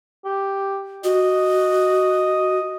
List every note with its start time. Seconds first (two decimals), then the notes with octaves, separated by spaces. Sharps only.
0.25 G4
1.04 F#4 D#5